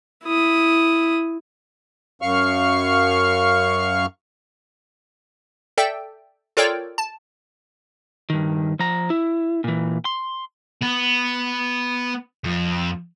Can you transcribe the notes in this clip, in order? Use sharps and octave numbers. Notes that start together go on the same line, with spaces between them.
E4 D#6
F#2 F5 C#6 F6
A4 D5 E5 G5
F4 A4 A#4 C#5 D5 G5
A5
G2 D#3
F3 A#5
E4
A#2 E3
C6
B3
F2